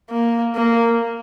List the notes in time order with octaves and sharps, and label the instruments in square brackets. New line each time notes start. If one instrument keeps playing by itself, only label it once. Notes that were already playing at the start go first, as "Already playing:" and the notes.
[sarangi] A#3
A#3